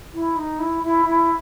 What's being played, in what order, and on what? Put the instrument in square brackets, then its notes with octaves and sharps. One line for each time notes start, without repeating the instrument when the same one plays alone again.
[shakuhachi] E4
D#4
E4
E4
E4